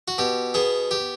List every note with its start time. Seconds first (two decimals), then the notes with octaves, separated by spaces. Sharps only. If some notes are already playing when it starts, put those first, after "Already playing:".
0.08 F#4
0.18 B2 G4
0.54 B3 G#4
0.91 G4